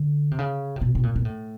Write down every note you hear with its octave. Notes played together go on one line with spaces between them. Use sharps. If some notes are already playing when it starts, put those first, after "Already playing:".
Already playing: D3
C3
C#3
C3
B2
B2
A#2
A#2
A2